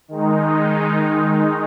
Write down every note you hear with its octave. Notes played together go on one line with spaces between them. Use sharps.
D#3 G#3 D#4